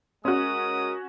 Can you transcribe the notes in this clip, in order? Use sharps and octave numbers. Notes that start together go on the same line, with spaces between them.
G#3 C#4 F#4 A#4 D#6